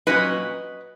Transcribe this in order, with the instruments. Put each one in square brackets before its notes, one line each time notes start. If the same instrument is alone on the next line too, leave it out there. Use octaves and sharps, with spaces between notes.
[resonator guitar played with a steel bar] A#2 F#3 C#4 B4 D#5